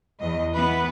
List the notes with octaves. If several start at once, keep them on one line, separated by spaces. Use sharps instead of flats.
E2 D#5
E3 B3 B4